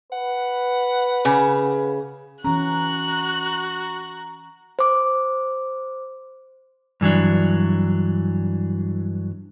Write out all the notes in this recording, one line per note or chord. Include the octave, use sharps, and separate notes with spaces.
B4 F#5
C#3
E3 C#4 F#4 A#5 F#6
C5 D6
G2 E3 F#3 D4